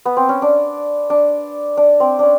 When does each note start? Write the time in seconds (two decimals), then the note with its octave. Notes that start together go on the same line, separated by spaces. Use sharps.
0.05 B3
0.17 C4
0.29 C#4
0.42 D4
1.10 D4
1.77 D4
2.00 C4
2.19 C#4 D4